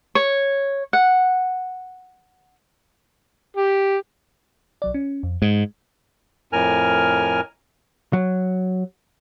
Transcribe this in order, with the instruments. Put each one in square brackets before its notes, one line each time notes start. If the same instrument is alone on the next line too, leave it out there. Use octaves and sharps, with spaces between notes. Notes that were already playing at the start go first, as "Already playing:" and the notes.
[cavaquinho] C#5
F#5
[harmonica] G4
[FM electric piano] B1 F#3 D5
C#4
F2
[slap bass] G#2 [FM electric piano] G#3
[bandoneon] F2 A2 A#4 G#5 F6
[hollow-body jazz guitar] F#3